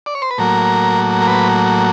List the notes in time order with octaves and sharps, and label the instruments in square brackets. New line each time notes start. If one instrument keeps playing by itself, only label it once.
[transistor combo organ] D5
C#5
C5
B4
A2 F#3 A#3 A#4
A#4
B4